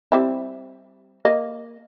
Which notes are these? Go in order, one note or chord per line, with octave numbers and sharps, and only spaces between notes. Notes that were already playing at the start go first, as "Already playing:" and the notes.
G3 C4 E4
A#3 D#5 F5